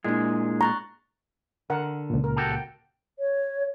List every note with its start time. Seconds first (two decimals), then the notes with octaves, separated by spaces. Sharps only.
0.05 A#2 G#3 D4 E4 G#4
0.61 A#5 C#6 F#6 A6
1.70 D3 A#4 F#5
2.10 C#2 A#2
2.24 A#4
2.36 F#4 G4 A4
2.52 G5
3.19 C#5